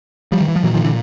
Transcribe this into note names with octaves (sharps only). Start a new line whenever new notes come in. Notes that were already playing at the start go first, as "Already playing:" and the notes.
F3 G3
D#3
E3
F3
A#2 E3 F#3
D#3 F3
D3 E3